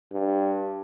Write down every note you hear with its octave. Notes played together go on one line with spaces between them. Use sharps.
G2